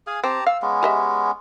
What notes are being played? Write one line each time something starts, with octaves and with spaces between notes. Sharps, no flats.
G#4 F5 G#5
C4 G4 A5 A#5
F5 E6
G#3 B3 C#4
G4 D#5 E5